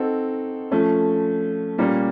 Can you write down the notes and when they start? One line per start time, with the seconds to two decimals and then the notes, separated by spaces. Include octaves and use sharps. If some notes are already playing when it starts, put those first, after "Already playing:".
Already playing: C4 D#4 F#4 A4
0.71 F3 A3 C#4
1.78 A#2 G3 A#3 C#4